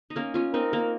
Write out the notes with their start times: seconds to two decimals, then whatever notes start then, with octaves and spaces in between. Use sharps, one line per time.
0.10 D#4
0.16 A#3 C#4
0.34 C#4 F4
0.54 C4 D#4 A#4
0.73 A#3